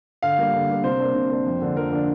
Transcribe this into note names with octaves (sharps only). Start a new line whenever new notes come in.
D3 F5
G3 A#3
D3
G3 A#3
C3 C5
A#3 D4
C3
A#3 D4
F2
D3 A#3 D4
F2 A#4
D3 A#3 D4